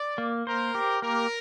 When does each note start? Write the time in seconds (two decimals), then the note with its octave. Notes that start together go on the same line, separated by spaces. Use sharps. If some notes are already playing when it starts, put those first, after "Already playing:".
Already playing: D5
0.18 A#3
0.47 A#4 C5
0.75 G4
1.02 A#3 A#4